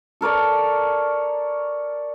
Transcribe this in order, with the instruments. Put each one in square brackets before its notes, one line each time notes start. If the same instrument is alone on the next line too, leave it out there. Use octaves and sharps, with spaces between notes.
[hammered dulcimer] A4 A#4 C#5 D5